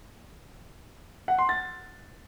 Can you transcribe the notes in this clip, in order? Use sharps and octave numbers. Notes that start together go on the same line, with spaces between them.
F#5
C6
A6